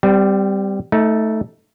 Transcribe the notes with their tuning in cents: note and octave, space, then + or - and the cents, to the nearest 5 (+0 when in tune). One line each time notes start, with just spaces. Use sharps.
G3 +0 C4 -35
A3 +0 D#4 +25